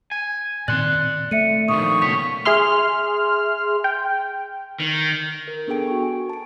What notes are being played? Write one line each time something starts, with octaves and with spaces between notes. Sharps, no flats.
G#5
A#2 D#3 C4 D5 C6 F#6
A3 E5 C#7 D#7
A#2 D#3 F3 C#6 D#6
C#2 B2 C#5 B6
G#4 E5 C6 F6
G5
D#3
A#4
B3 D4 G#4 A4 G5 D7
F#4 C#6
G#5
A5 D7